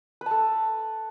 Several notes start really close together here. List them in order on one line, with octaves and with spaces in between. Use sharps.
B4 A5 A4